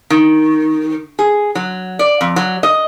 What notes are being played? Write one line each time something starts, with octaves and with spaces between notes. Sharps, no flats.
D#3
G#4
F#3
D5
F2
F#3
D#5